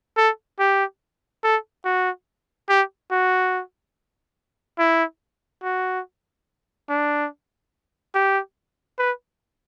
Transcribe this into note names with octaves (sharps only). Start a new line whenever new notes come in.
A4
G4
A4
F#4
G4
F#4
E4
F#4
D4
G4
B4